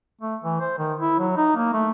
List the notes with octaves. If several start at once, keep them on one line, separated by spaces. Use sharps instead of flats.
A3
E3
C5
D#3
E4
F#3
D#4
A#3
A3